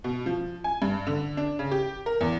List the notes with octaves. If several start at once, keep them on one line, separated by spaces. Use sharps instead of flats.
B2
F3
G#5
G2
D3
D4
C#3
G4
A#4
E2